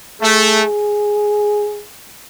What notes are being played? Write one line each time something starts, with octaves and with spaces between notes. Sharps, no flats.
A3 G#4